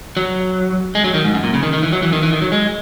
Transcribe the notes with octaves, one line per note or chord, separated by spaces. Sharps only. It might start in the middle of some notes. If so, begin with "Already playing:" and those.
F#3
G#3
F#3
D#3
G#2
F#2
A#2
C#3
D#3
D#3
E3
F#3
E3
D#3
E3
D#3
F#3
G#3